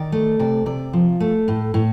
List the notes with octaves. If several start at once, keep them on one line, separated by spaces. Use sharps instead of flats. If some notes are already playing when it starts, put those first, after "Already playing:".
Already playing: D#3 D5
A3
C3 D5
C3 D5
F3
A3
A2
A2